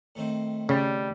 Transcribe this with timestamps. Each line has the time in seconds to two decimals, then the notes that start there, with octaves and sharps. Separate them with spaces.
0.15 A2 D#3 C4
0.69 C#3 G3